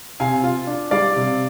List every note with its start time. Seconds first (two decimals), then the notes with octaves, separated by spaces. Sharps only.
0.20 C3 F5 G#5
0.44 F4
0.67 D4
0.91 G3 D5 F5
1.16 C3